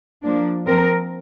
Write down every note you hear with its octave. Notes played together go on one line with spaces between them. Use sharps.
F3 A#3 D4
F3 C4 A#4